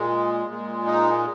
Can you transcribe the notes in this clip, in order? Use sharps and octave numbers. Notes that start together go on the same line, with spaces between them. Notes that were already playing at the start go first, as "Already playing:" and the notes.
Already playing: A#2 G#3
A#2 G#3
D#4